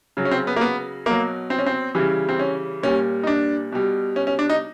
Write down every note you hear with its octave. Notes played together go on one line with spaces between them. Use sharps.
C#3 F#3
C#4
C4
B3
A#3
B3
B2 F#3 A#3
C4
C#4
C4
C#3 E3 G3
C4
C#4
A#2 G3 C#4
D#4
D4
B2 G3
C#4
C#4
D4
D#4